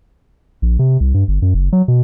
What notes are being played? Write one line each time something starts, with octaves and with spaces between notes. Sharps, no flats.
A#1
C3
C2
G2
G1
F#2
F#1
F#3
B2